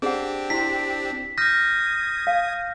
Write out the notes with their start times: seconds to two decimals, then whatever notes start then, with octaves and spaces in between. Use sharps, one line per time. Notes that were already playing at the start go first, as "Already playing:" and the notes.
0.02 C4 D4 G4 G#4 F#5
0.50 E4 F#4 B6
1.38 D#6 F6 G6 G#6 A#6
2.27 F5